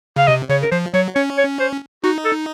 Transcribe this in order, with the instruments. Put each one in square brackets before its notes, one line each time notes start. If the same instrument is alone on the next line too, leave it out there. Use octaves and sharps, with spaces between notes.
[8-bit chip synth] C#3 [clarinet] F5
[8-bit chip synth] C3 [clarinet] D#5
[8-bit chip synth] C#3 [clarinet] C#5
[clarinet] A#4
[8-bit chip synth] F3 [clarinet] C5
[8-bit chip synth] F#3 [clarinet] C#5
[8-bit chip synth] C#4 [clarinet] C#5
[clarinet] C#5
C5
[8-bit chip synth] D#4 [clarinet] F#4
[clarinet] A4